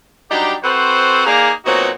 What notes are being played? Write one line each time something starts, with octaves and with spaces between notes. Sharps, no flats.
F#3 G3 D4 D#4 G4
C4 F#4 A4 B4 C5 F#5
A#3 D#4 G#4 D5 F5 A#5
A#2 F#3 B3 C4 D#4 F#4